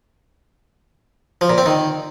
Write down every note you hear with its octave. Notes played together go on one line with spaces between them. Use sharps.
F3
A#2
C4
D#3